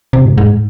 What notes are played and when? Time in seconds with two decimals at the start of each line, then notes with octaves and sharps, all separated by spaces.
0.13 C3
0.25 G#2
0.38 G#2